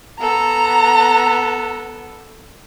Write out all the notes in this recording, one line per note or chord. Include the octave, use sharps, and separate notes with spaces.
B3 A4 A#5